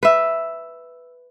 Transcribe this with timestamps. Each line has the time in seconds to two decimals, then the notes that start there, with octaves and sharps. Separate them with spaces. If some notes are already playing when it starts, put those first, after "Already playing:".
0.03 B4 E5